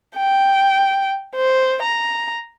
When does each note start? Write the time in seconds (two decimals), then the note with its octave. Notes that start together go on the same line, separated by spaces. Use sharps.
0.17 G5
1.36 C5
1.82 A#5